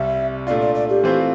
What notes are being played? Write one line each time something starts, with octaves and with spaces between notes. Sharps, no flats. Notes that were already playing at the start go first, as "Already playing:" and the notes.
Already playing: C2 C3 G3 E5
A#2 A3 D4 F4 D5
D5
D5
G4
E3 A3 C4 F4 C5